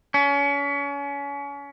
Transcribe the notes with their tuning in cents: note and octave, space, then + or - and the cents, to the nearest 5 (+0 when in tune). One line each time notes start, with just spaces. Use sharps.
C#4 +35